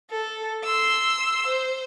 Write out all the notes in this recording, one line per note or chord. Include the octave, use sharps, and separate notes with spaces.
A4
C6 E6
C5